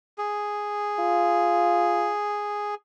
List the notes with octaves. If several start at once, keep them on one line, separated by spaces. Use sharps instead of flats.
G#4
F4